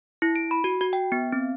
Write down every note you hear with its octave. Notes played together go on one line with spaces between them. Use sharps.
E4
D7
B5
F#4
F#4
G5
B3
C4